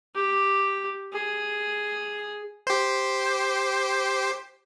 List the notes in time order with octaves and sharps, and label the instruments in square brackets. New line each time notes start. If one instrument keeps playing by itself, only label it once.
[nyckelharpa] G4
G#4
[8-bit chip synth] G4 C5